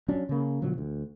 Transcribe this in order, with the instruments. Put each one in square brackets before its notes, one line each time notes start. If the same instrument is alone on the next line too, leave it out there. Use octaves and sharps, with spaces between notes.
[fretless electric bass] F#3 C#4 D4
C#3 A#3
B2 D3 F3 F#3
D2